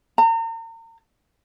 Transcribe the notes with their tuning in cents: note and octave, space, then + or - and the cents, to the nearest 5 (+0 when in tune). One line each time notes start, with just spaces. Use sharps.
A#5 -40